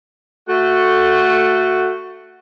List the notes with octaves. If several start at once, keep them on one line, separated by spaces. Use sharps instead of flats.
A3 F#4